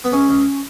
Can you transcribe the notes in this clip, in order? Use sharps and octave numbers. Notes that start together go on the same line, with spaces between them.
B3
C#2 C#4
C#2